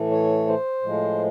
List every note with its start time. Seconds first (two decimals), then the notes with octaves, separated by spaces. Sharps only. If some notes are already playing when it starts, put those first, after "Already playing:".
Already playing: A2 E3 A3
0.11 C#5
0.47 C5
0.82 A2 F3 G#3